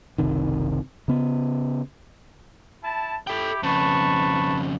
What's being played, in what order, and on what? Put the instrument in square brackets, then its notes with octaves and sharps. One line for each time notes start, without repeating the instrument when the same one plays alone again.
[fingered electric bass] F#1 C2 C3 D#3
C#3 B3
[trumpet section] E4 A5
[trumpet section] E4 G4 [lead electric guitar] A4 G5
[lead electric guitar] F2 C#3 [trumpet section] B4 A5 C#6